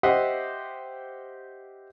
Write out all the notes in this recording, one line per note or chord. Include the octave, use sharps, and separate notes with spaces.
G4 C5 D#5 E5 F#5